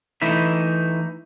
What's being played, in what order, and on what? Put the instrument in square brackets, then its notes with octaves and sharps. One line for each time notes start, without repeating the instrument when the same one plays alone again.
[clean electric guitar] E3 A3 D#4 E5